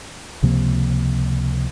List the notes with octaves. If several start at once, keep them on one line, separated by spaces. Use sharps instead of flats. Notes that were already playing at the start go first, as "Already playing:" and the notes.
C#2 C3 F3 A#3